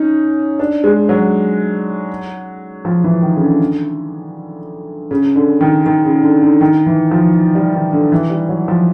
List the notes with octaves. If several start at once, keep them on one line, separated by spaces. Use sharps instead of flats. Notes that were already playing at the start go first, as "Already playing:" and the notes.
Already playing: C#4 D#4
D4
G#3
F#3
F3
E3
D#3
C#3
D3
C#3
D3
D#3
D#3
C#3
D3
D3
D#3
E3
F3
G3
D#3
D3
E3
G3
F#3
F3